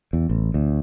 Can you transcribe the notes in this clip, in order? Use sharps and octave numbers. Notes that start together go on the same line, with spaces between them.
E2
A1
D2